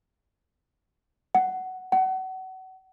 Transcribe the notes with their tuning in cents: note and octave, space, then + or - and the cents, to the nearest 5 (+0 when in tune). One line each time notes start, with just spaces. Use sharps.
F#5 +10
F#5 +30